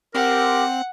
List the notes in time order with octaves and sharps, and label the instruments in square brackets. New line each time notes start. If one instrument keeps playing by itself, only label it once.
[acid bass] C4 [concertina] G4 D6 [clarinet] A#4 [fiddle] F#5